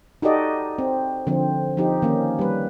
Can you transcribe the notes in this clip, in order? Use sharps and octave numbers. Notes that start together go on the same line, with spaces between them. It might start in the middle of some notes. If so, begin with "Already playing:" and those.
D#4 F#4 G4 A4 D5 D#5
C4
D3 F3 C4
F3 C4 D#4 G4
D#3 A#3 C#4
G3 B4